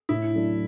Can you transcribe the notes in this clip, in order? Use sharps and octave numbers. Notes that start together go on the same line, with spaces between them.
A2 E4
F#3 A3 D4